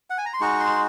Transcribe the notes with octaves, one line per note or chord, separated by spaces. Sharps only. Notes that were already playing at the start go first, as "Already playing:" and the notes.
F#5
G#5
A#5
C6
G#3 D#4 F#4 C#6
C6